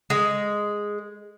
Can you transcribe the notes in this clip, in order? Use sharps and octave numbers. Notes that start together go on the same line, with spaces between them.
G#3